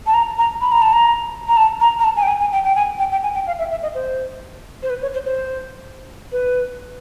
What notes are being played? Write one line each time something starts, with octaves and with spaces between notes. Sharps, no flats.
A5
A#5
A#5
B5
A#5
A5
A#5
A#5
A5
A#5
A#5
A5
G#5
G5
G#5
G#5
G5
G5
G#5
G5
G5
G#5
G5
F5
E5
E5
D#5
C5
C5
B4
C#5
C5
C5
B4